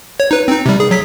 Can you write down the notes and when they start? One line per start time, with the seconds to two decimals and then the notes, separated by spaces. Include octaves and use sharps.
0.20 C#5
0.31 D#4 B4
0.48 C4 D#4
0.66 C3 G3
0.80 G#4
0.91 F#3 B6